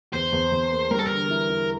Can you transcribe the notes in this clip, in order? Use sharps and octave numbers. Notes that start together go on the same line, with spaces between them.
E2 C5
E2
E2
A#3
G3 A#4
A4
D3 A#4
E4
E4